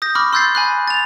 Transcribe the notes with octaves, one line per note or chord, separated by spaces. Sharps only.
D#6 G6 A#6
B5 C#6 D6 F6
C6 E6 F#6 G6 A6 C7
G#5 B5 F#6
A6 F7